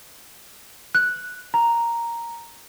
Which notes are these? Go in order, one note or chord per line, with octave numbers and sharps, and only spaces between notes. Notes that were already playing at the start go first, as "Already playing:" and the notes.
F#6
A#5